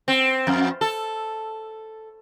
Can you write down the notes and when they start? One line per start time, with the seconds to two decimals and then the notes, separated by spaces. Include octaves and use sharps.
0.08 C4
0.47 F2
0.81 A4